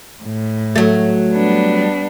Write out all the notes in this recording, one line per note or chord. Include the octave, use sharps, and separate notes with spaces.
A2
F#3 A3
G3 B3 D4